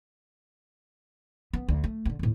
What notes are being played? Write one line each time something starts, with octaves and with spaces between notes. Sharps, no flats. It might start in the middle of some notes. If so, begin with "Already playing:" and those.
B3
D2
A3
D2 D3
D#2 A2